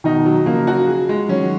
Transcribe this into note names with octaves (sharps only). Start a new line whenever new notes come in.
B2 D#3 D#4
F#3
C#3 F3 A#3
F#4
G#4
G#3
D#3 F#3 C#4